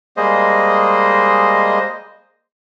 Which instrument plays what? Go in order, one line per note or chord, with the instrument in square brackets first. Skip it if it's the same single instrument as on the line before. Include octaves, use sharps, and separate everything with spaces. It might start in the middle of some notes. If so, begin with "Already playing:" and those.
[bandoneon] G3 G#3 A#3 G#4 C5 D#5